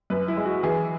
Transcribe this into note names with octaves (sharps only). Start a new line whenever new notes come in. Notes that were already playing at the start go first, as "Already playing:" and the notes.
F#2 B4
E4
G#3
F#4
E3 G#4